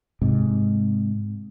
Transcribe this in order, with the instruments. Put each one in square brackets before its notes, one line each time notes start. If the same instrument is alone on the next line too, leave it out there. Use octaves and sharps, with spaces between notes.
[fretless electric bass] G#2 C3